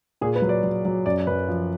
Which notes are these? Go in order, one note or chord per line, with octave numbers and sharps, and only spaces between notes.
A#2 G#4
B4
F#3
D5
F#3
F#3
F#2 D5
F#2 B4
F3